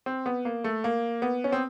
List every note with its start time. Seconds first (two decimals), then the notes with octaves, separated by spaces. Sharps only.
0.06 C4
0.26 B3
0.45 A#3
0.64 A3
0.84 A#3
1.22 B3
1.44 C#4
1.52 C4